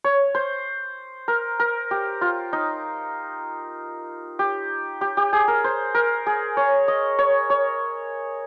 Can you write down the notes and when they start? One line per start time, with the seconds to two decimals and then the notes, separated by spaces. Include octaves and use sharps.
0.04 C#5
0.35 C5
1.28 A#4
1.60 A#4
1.91 G4
2.21 F4
2.53 D#4
4.39 G4
5.01 G4
5.17 G4
5.33 G#4
5.48 A#4
5.64 C5
5.95 A#4
6.27 G#4
6.57 C#5
6.88 D#5
7.19 C#5
7.50 C#5